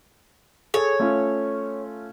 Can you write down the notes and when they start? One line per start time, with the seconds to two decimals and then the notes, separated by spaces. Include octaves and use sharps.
0.74 G#4 A4 C#5
0.99 A3 C#4 F4